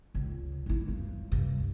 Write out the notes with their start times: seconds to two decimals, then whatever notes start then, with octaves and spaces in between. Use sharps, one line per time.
0.15 C#2
0.66 G1 E4
0.88 G2
1.32 C2 G2